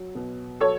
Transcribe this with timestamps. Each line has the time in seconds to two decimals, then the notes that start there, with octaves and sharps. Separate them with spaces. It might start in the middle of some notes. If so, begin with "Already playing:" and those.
Already playing: F#3
0.15 B2
0.60 F#3 A4 C#5